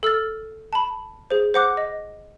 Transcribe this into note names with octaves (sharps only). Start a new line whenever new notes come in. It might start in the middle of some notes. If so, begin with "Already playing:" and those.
A4 E6 F6 A6
A5 B5
G#4 C5
C5 F#5 D6 F#6
D#5